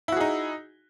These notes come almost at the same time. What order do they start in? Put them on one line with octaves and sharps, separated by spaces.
E4 F#4 G#4 D#4